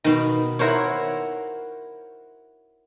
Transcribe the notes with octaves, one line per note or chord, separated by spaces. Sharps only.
B2 D#3
E4 F#4 A#4 C5 C#5